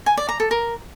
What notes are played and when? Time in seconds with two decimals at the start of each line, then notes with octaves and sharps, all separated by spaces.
0.06 G#5
0.17 D5
0.29 A#5
0.40 A4
0.51 A#4